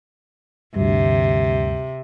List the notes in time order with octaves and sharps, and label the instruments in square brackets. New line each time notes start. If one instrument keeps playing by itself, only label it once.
[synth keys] D2 G2 [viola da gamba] C3